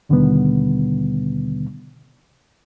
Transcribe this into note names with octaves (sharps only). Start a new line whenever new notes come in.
D#2 B2 D3 D#3 G3 B3